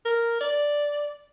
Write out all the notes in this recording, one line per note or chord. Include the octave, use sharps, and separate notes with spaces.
A#4
D5